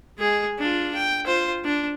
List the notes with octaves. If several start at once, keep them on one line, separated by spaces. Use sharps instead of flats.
G#3 G#4
D4 F4
G5
F4 C5
D4